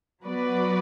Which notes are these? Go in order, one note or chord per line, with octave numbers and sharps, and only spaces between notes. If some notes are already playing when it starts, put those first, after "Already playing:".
F#3 B3 F#4 B4 D5